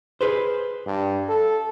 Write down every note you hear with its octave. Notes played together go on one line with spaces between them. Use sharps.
G#4 B4 C5
G2
A4